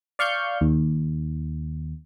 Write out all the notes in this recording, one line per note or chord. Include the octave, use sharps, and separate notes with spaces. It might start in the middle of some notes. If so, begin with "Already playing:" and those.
D5 F5 C#6 F6 G6
D#2